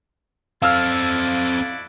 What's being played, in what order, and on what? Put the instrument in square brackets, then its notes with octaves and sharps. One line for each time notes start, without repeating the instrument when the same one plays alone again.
[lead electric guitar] C4 A4 [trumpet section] E4 F#4 D5 [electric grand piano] F5 E6 F6